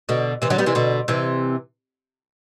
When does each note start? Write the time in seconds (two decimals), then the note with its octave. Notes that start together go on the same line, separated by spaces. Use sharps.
0.09 B2 D3
0.42 C3 E3
0.50 D3 F#3
0.58 G3 B3
0.66 C3 E3
0.75 B2 D3
1.08 C3 E3